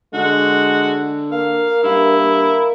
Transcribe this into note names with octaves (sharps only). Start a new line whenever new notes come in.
D3 G#3 F#4
A#3 F5
G2 E4
A#3